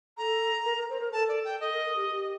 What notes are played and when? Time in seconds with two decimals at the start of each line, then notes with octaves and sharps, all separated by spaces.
0.17 A4 A#5
0.65 A#4
0.77 A#4
0.89 C5
1.00 A#4
1.13 A4 A5
1.28 D5
1.45 G5
1.60 A4 D#5
1.73 A#4
1.85 A#4
1.96 G4
2.09 G4